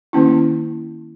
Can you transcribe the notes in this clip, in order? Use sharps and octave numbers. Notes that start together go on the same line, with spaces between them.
D#3 A#3 C#4 E4